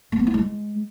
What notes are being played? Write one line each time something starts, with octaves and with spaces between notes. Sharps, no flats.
A3
B3
E4
G#3